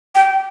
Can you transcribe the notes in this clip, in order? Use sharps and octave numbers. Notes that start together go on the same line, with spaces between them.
G5